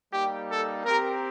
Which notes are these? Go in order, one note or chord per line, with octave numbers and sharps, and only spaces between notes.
G3 A#3 D#4 G4
A4
C4 G4 A#4